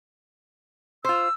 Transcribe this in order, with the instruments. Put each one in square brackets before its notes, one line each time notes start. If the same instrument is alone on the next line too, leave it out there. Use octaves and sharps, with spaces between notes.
[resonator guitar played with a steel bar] F4 C5 [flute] E6